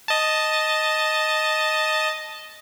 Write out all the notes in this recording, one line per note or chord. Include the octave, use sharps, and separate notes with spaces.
D#5 A5